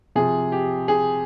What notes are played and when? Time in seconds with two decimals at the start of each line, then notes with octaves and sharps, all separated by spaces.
0.15 C3 F3 G#4
0.52 G4
0.88 G#4